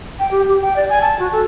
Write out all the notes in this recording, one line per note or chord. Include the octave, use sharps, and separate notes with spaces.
G5
G4
G4
G5
D5
G#5
A5
F#4
A4